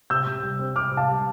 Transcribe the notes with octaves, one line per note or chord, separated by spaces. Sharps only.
C3 E6 G6
C3
G3
C4
C3 D6 F6
C3
F5 A5
G3